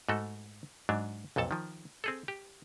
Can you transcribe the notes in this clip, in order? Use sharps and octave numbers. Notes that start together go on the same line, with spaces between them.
G#2 A3 F#4 A4
G#2 F#3 D4
B1 F2 A#2 A4 A5
D#3 F3
C4 G#4 A4
G4